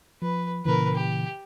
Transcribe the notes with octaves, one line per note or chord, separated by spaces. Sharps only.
F3 B4
A#2 C#3 E3 A#4 B4
G4